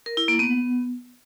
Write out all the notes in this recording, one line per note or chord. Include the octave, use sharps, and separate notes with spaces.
A#4
E4
A#3
B3